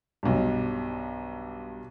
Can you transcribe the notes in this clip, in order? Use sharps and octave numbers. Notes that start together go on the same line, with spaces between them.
B1 G2